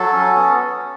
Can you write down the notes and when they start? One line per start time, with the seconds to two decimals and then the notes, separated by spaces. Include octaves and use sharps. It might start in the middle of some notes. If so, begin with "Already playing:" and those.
Already playing: F#3 A4
0.13 C#4
0.36 B3